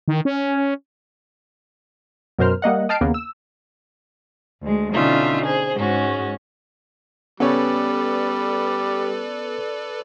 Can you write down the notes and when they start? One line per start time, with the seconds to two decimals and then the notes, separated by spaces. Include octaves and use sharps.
0.08 D#3
0.25 C#4
2.39 F#2 B2 A#4 C5 F6
2.62 G3 A#3 D#5 F#5
2.89 D#5 G5 A5 F6 C7 D7
3.01 D#2 C#3 A#3 B3
3.14 E6
4.63 D2 G#3
4.93 B2 D3 C#4 D#4 F4 E5
5.45 G#4 C5
5.75 G#2 G#3 C#4 F#4
7.40 C#3 G3 B3 A4 B4 C#5 D5